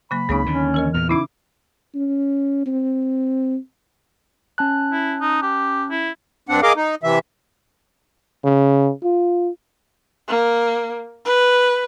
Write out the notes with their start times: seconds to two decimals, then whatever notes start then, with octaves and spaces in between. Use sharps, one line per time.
0.11 C#3 F#3 A#3 B5
0.29 C#2 C#3 A#3 C4 D#4
0.46 D#2 D3 C#4
0.74 E3 A#4 D#5
0.94 E2 A#2 F6
1.09 C#3 C#4 D#4 E4 D6
1.95 C#4
2.66 C4
4.58 C#4 A5 F#6
4.92 E4
5.21 D#4
5.42 G4
5.91 E4
6.49 G2 C4 D4 F#5
6.63 G#4 A#4 D#5 F5 D6
6.76 D#4
7.03 C3 E3 E5
8.44 C#3
9.03 F4
10.28 A#3
11.25 B4